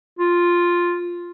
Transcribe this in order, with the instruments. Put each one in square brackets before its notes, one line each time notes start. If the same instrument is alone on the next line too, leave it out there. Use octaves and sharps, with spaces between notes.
[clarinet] F4